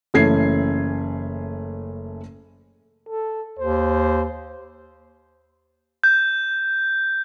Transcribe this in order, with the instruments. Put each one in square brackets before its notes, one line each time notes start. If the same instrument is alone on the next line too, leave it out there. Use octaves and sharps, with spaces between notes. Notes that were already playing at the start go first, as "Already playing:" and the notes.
[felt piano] F#1 E3 A3 C#4 G#6 C7
[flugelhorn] A4
[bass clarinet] D#2 [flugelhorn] C5
[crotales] G6